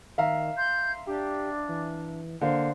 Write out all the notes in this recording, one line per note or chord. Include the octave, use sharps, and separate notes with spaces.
D#3 E5 F5 A#5
C6 G6
D4 G4
E3
D3 A#3 C5 F5